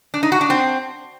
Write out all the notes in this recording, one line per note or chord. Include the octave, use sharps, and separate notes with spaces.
D4
D#4
F#4
D4
C4